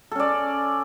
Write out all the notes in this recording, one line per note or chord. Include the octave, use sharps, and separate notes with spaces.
C#4 A4 D5